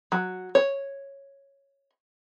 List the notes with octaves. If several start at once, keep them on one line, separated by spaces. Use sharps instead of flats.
F#3
C#5